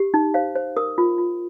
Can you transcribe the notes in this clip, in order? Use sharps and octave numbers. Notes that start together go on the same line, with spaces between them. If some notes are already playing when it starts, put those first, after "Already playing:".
Already playing: G4
D#4
C5 F5
C5
A#4 D#6
F4
F4